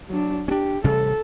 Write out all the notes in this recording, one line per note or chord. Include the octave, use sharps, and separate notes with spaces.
F#3 D4
C#4 D4 G4
A1 C3 G3 A4